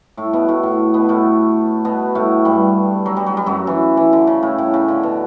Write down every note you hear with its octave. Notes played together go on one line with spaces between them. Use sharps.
A2 A3
B2 B3
A2 A3
A2 A3
B2 B3
A2 A3
B2 B3
A2 A3
G2 G3
F#3
G3
F#3
G3
F#2 F#3
E3
E3
D3
C#3
A2
A2
C#3
D3
B2